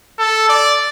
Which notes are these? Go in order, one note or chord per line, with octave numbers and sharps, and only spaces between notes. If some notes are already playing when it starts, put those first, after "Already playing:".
A4
D5